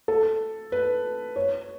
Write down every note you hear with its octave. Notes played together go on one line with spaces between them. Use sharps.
A4
B4
C#5